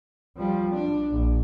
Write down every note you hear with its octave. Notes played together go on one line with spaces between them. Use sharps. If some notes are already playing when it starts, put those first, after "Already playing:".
F3 G3
D4
A#1